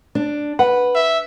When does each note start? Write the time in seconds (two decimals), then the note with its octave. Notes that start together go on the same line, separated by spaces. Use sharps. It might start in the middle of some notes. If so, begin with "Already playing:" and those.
0.15 D4
0.59 B4 F#5
0.95 E5